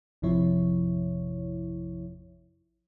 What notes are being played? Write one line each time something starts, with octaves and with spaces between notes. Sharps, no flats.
A1 F2 C3 F3 E4 C#5